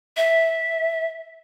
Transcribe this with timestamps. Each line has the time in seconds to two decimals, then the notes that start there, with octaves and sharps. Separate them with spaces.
0.17 E5